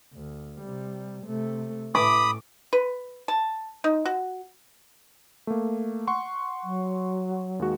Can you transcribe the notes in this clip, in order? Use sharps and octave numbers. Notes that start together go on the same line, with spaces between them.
D2
C3 G3
C3 A3
A2 B5 D6 D#6
B4
A5
D#4
F#4
A3 A#3
F#5 C6 C#6
F#3
D#2 G#3 F#4